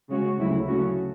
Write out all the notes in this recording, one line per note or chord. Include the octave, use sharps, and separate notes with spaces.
C#3 G#3 C#4 F#4
D2 C#3 F#3 A3 E4
C#3 F#3 A3 C#4 F#4